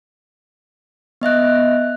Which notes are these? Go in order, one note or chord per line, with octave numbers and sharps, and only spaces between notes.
B3 D#5 E5 F#6